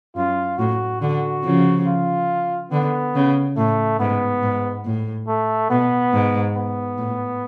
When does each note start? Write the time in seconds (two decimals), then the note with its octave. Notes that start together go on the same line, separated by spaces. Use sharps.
0.16 F#2 F4
0.58 A2 F#4
1.01 D3 F#4
1.44 C#3 F3
1.86 F4
2.72 D3 B3
3.15 C#3
3.57 A2 A3
3.99 G#2 B3
4.43 G#2
4.85 A2
5.27 A3
5.70 B2 B3
6.13 G#2
6.55 B3
6.98 A2